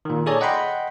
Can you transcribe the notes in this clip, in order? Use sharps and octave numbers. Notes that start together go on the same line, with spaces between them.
A#2 D#3
G#4 A4 C#5 D5 G#5 A#5
D#5 F#5 G5 B5 C6